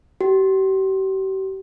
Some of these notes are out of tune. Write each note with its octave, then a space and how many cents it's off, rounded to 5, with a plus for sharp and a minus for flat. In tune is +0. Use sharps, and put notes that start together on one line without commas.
G4 -40